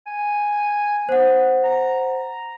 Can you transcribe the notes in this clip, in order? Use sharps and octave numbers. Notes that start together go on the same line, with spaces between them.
G#5
B3 C5 F#5
A#5